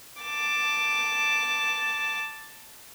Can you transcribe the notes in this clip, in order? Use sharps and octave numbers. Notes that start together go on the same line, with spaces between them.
A5 D6